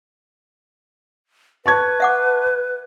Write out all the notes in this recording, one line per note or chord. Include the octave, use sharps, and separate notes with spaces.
B4 A5 C#6 G#6
E5 F#5 D6